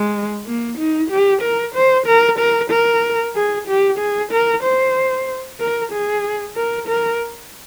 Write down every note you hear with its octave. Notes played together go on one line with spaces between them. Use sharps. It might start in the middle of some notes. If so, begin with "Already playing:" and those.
Already playing: G#3
A#3
D#4
G4
A#4
C5
A#4
A#4
A#4
G#4
G4
G#4
A#4
C5
A#4
G#4
A#4
A#4